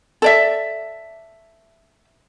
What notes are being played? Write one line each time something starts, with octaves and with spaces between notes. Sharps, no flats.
A4 D5 E5